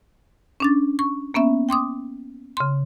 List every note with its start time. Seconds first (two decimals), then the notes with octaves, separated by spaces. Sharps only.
0.60 C#4 D4 A6
0.99 C#6
1.34 A#3 B3 C#4 E5
1.69 G5 C6 D6 D#6
2.57 C#3 C6